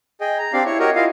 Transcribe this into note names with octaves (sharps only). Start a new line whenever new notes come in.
G#4 D#5 G5
A#5
C4 D4 G4 D5 F5
E4 C#5
F#4 G4 A#4 C#5 D#5
E4 F4 D#5 F5